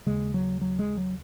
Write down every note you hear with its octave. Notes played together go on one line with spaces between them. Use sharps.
D#2 C#3 G#3
F#3
F#3
G#3
F#3